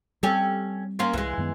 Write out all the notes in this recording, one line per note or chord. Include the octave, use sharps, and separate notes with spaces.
G3 C4 C#4 G4 A4
A#3 C#4 F4
C2 E3 G#3
F#2 D#3 B3